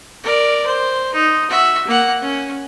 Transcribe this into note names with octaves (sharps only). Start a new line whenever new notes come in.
A#4 D5
C5
D#4
F#4 E5
A#3 F#5
C#4